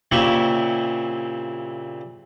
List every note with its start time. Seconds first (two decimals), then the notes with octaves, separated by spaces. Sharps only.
0.11 A#2 C#3 C4 E4 G4 C#6